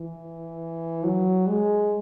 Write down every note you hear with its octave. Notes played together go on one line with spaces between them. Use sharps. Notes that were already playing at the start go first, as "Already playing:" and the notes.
Already playing: E3
F#3
G#3